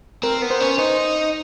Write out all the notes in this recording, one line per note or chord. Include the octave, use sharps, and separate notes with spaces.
C4 A#4
B3
C5
C#4
D#4 C5